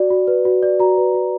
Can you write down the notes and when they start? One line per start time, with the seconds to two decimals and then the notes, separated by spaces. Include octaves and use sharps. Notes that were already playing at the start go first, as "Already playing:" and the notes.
Already playing: F#4 D5
0.10 F#4
0.27 B4
0.45 F#4
0.63 D5
0.79 F#4 A#5
0.97 B4
1.14 F#4